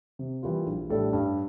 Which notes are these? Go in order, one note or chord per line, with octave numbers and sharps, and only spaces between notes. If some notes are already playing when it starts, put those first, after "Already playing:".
C3
E3 G3 A#3 F4
A#1
A2 G3 D4 A4
G2